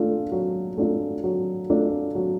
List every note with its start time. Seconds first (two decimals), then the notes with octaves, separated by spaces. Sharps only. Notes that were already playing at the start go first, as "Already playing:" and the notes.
Already playing: A3 D4 F4
0.32 F#3
0.78 A3 D4 F4
1.24 F#3
1.70 A3 D4 F4
2.15 F#3